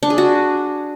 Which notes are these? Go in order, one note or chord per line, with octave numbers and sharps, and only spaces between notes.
D4
G#4
F#4